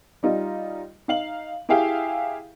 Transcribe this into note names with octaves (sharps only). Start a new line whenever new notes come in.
G3 D#4 F4
D#4 F5 F#7
E4 G4 G#4 E5 F5 G5